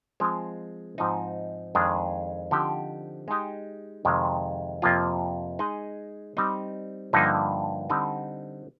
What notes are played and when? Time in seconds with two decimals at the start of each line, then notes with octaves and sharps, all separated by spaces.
0.20 F3 G#3 C4
0.98 G#2 F3 C4 D#4
1.75 F2 D#3 G#3 D4 G#4
2.51 D3 F3 C4 D#4 G4
3.28 G#3 D#4 G4
4.05 F2 C3 D#3 G#3
4.82 F2 C3 F3 A#3 F4
5.59 G#3 D#4 G#4 D#5
6.37 G3 C4 D#4
7.13 G2 D3 F3 A#3 D#4
7.90 D3 G3 C4 D#4